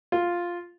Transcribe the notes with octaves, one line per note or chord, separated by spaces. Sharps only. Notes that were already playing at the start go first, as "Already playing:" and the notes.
F4